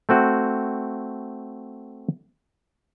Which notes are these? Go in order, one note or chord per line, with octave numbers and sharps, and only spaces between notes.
A3 C4 F#4